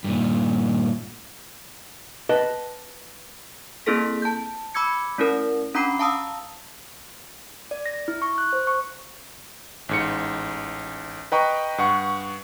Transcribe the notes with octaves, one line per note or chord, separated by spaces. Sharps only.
G2 A#2
B4 D#5 G5 A5
A#3 C4 E4 G#4 A4 B6
A5 G6
B5 D6 E6 G#6 C#7
A3 C#4 E4 A#4
C#4 D4 A#5 B5 D6 C7
F5 A5 A#5 D#6 E6
D5
A#6
E4
C#6
F#6
C5
C#6
A1 G#2 C#7
B4 D#5 G5 A#5 C#6
G2 F#5 C#6